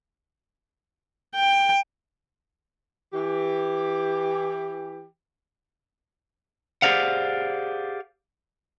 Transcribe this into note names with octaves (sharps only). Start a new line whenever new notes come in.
G5
E3 G4
G4 G#4 C5 D5 F5 F#5